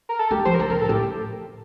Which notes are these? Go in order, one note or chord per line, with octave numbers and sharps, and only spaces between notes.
A#4
A4
A3 G4
F3 C5
A#4
D3
A4
C3 A#4
A#2 A4
A2 G4